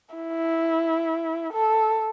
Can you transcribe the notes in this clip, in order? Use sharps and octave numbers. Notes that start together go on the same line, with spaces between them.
E4
A4